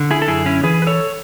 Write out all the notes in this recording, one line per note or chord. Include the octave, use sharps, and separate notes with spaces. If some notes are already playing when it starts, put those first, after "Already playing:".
Already playing: D3
E4 G#4
A4
F#2 E4 G#4
C#4 E4
E3 G#4 B4
B4
A4 C#5